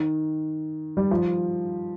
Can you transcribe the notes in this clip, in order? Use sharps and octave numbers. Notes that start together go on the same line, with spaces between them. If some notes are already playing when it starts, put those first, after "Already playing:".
Already playing: D#3
G3
F3